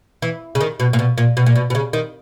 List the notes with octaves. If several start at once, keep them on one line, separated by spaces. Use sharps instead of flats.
E3
C#3
D#3
B2
A#2
B2
A#2
B2
A#2
B2
B2
C#3
D#3